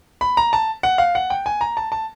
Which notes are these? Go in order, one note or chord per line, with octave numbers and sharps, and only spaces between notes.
B5
A#5
A5
F#5
F5
F#5
G5
G#5
A#5
A5
A5